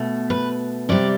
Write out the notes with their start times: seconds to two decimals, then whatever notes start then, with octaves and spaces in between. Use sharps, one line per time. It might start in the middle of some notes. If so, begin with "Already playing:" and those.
Already playing: B2 A3
0.30 B4
0.89 C3 G3 D5